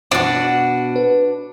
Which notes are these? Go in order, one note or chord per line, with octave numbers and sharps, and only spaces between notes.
B2 D4 F#4
B4